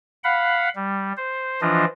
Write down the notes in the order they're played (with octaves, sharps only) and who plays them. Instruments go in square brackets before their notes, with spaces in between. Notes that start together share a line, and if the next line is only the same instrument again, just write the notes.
[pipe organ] F5 F#5 B5
G3
C5
E3 F3 D4 F4 D#5